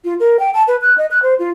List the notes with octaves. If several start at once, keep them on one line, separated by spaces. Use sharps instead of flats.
F4
A#4
G5
A5
B4
F#6
D#5
F#6
C5
F4